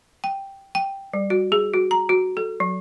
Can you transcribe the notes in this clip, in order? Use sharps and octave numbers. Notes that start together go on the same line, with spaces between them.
G5
G5
G3
F#4
G#4
F#4
A#5
F#4
A4
F#3